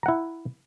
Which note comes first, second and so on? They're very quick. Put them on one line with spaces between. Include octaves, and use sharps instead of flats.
A#5 F#5 E4